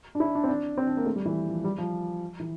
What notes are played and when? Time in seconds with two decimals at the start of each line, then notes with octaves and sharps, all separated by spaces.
0.15 D4
0.20 E4
0.35 D4
0.44 C4
0.49 D4
0.78 C4
0.87 D4
0.97 A#3
1.06 A3
1.16 G3
1.26 E3
1.49 F3
1.64 G3
1.78 F3
2.40 E3